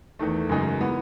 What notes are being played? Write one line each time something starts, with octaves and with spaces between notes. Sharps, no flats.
E2 D#3 A3
F#2 C#3 G#3 D#4 G#4
E3 B3